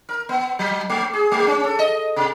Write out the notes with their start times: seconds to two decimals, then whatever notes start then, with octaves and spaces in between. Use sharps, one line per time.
0.09 A#4
0.29 B3
0.59 F#3
0.90 A3
1.13 G#4
1.32 A3
1.47 C#4
1.65 A4
1.79 D#5
2.16 C3